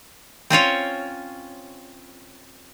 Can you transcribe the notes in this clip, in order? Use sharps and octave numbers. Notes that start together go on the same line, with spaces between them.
C4 C#4 F4 C#5